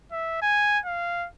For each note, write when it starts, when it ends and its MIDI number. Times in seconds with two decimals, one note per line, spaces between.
0.12 0.39 76
0.42 0.79 80
0.86 1.28 77